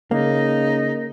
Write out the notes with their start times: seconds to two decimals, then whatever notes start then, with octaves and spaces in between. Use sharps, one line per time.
0.11 C#3 A#3 D#4